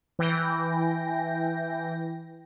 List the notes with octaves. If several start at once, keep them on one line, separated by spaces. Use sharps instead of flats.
E3 G5 A#6